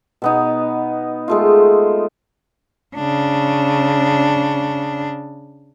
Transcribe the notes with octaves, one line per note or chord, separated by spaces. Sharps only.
B2 B3 D#4
G#3 A3 F4
C#3 D4